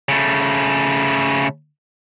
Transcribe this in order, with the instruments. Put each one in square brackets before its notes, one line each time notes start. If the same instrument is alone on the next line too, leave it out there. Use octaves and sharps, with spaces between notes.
[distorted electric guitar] C#3 A3